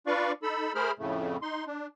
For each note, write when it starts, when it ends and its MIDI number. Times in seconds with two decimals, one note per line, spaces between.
0.07 0.32 62
0.07 0.32 65
0.07 0.32 71
0.07 0.32 74
0.07 0.32 77
0.07 0.32 85
0.43 0.72 63
0.43 0.72 69
0.43 0.72 83
0.43 0.72 88
0.75 0.91 57
0.75 0.91 68
0.75 0.91 70
0.75 0.91 72
0.75 0.91 83
0.75 0.91 89
0.99 1.37 41
0.99 1.37 45
0.99 1.37 49
0.99 1.37 57
1.42 1.65 63
1.42 1.65 84
1.67 1.87 62